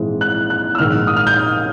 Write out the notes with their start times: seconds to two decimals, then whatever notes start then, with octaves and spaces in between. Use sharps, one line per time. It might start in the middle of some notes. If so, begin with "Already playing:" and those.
Already playing: A#1 G#2 E3 G#3 C4
0.21 F#6
0.50 F#6
0.75 E6
0.78 A#1 G#2 D#3 G#3 F6
1.07 D#6
1.16 F6
1.27 G6